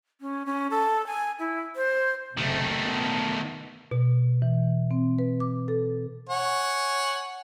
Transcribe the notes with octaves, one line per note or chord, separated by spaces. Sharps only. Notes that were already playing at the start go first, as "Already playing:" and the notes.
C#4
C#4
A4
G#5
E4
C5
F#1 C3 D#3 A3
B3
B2
E3
C4
B4
D6
A4
C#5 F#5 G#5